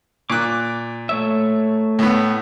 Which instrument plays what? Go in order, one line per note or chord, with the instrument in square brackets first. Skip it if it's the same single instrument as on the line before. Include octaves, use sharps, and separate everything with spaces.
[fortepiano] A#2 F#6 [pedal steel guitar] D6
[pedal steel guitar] A3 C#5 E5
[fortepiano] A2 B3